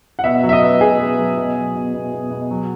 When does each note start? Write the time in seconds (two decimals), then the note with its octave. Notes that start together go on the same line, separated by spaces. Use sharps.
0.19 F#5
0.24 B2 E5
0.43 F#3
0.49 E5
0.53 D#5
0.62 B3
0.81 B2 G#4
0.99 B3
1.18 F#3
1.37 B2
1.57 F#3
1.75 B2
1.94 B2
2.12 B2
2.31 B2
2.51 F#3